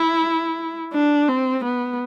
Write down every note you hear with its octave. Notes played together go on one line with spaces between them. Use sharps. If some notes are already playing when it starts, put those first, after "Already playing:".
Already playing: E4
D4
C4
B3